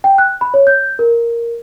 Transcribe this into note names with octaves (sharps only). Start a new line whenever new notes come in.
G5
F#6
B5
C#5
G6
A#4